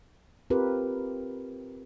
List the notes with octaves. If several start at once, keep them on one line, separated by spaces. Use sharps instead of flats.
C4 F4 G4 A#4 B4